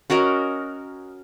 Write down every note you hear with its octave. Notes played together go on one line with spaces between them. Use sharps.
C#4 F#4 A#4 D#5